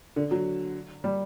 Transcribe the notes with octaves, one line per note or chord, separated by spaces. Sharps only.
D3
F#3
G3